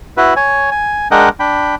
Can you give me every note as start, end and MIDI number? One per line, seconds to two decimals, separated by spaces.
0.17 0.34 64
0.17 0.34 66
0.17 0.34 71
0.36 0.70 73
0.36 0.70 80
0.71 1.08 80
1.11 1.29 56
1.11 1.29 62
1.11 1.29 70
1.11 1.29 75
1.11 1.29 78
1.11 1.29 79
1.40 1.75 62
1.40 1.75 79
1.40 1.75 83